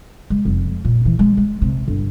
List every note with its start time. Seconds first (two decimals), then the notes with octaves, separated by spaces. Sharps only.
0.30 G#3
0.45 F1
0.64 F2
0.85 A#2
1.05 E3
1.19 G#3
1.37 G#3
1.62 C3
1.88 G1